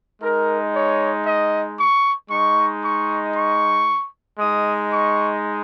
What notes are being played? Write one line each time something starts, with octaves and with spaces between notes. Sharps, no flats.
G#3 D#4 A#4
C#5
D#5
C#6
G#3 D#4 C#6
C#6
C#6
G#3 D#4 D#6
C#6